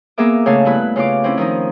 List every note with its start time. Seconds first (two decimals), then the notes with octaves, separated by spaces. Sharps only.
0.18 A#3 B3 G#4 A#4 E5 D6
0.45 A2 C#3 A3 F5 G#5 A5
0.65 G2 B3 E4 B4 F#6
0.96 C#3 F4 F5 D6
1.24 C4 C#4 E4
1.37 D#3 F3 D#4